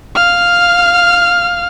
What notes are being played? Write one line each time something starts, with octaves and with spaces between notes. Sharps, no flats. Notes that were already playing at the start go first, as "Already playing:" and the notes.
F5 F6